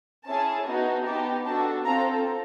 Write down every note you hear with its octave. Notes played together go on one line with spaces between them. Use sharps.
C#4 E4 G#4 A5
B3 D#4 F#4
B3 D#4 G4 A5
D4 F#4 A4 A5
C4 F4 A4 A#5